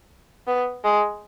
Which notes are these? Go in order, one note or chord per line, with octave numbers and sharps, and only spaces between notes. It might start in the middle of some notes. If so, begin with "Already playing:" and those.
B3
G#3